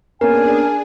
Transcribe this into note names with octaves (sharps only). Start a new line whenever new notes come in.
A#3 B3 C#4 D4 G#4 A#4 G#5